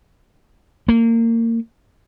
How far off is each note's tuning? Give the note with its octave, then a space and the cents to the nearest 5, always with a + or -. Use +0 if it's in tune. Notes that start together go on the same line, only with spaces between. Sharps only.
A#3 -25